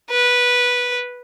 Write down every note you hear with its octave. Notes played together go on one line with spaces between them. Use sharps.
B4